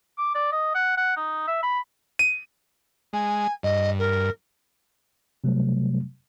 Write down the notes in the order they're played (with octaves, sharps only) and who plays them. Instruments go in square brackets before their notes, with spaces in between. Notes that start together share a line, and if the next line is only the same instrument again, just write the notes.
[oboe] D6
D5
D#5
F#5
F#5
D#4
E5
B5
[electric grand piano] D#7
[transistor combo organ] G#3 [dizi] G#5
[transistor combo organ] G2 [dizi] D#5
[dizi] A#4
[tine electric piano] C3 F#3 G3 A3